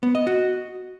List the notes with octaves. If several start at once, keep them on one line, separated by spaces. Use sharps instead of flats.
B3
D#5
F#4